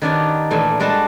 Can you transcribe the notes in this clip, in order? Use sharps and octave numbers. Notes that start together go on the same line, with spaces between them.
D#3 B3 D4 D#4 G4 C#5
A#2 E3 A3 D4 G#5
G3 G#3 D4 F#4 A5